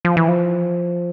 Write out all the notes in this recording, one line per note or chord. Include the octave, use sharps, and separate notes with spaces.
F3
E3
F3